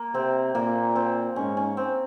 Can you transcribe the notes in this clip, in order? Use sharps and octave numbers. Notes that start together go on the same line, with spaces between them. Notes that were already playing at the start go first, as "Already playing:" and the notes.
Already playing: A#3
C3 C4
A#2 A#3
C4
G#2 C#4
C#4
C4